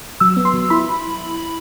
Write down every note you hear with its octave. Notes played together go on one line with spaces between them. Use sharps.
F#3 E6
B3
C6
F#3
E4 B5